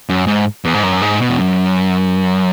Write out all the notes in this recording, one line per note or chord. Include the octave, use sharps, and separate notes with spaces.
F#2
G#2
E2
G#2
F#2
G#2
B2
E2
F#2